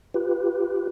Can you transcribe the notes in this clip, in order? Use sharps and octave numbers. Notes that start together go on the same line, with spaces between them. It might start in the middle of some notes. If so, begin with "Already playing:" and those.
F4 G4 B4